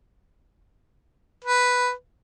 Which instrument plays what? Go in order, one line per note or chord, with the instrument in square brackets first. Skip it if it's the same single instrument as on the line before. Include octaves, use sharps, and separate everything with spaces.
[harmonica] B4